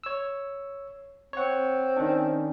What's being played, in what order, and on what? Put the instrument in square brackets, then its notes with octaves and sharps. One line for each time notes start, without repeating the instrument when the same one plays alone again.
[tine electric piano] C#5 E6
[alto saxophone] C4 [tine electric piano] C#5 F#5
[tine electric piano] D#3 C#4 D4